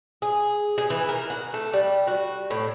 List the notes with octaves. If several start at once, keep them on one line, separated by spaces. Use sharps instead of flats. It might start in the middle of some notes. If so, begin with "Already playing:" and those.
G#4
G#4
E3
A#4
F#4
A3
G3
F#4
A2